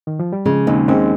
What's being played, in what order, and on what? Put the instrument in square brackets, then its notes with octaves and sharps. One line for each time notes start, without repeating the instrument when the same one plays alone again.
[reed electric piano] D#3
F3
G3
[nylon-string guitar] C#3 [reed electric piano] F3 G#3
[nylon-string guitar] D#2 [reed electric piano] G#3 C4
[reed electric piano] G#3 C4 [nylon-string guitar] C#4